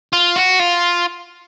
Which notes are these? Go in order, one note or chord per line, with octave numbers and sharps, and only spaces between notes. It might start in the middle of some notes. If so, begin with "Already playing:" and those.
F4
F#4
F4